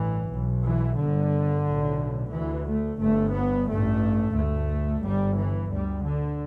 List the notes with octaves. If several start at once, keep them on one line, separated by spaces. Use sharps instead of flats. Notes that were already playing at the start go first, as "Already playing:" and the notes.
Already playing: A1 G2 E3
B1 B2
E3
G1 G2 D3
B1 A2
D2 E3
A3
G1 G2 A3
B3
A1 G2 A3
D2 A3
G1 G2 G3
E3
D2 G3
D3